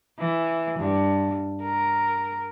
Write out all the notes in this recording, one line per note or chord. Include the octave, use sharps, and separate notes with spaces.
E3
G2
A#4